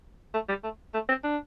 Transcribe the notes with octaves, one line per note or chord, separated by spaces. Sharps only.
A3
G3
A3
A3
C4
D4